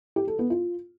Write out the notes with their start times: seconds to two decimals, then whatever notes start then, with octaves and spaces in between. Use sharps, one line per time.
0.16 G4
0.27 A4
0.39 B3
0.50 F4